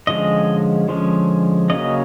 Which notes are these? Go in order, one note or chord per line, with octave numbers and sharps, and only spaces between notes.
D3 F3 G#3 C#4 D#5
D3 F3 G#3 C#4
C#3 F#3 A#3 C#4 D#5